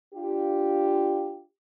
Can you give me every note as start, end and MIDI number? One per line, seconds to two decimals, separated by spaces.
0.15 1.42 62
0.15 1.42 65
0.15 1.42 67